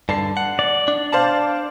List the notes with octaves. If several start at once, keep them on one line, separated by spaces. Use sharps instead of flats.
G2 D3 A5 C7
F#5
D5
D4
C5 F5 A5